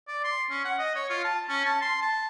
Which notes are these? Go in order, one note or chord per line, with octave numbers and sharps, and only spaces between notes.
D5
C6
C#4
F#5
D#5
C#5
F4
A5
C#4
A5
C6
A5